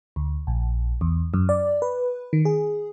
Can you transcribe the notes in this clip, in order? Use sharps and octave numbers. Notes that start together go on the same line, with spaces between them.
D2
A#1
E2
F#2
D5
B4
D#3
G#4